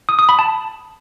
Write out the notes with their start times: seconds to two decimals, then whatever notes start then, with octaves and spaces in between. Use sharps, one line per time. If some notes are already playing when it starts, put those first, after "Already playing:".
0.09 D#6
0.19 D#6
0.29 B5
0.39 A5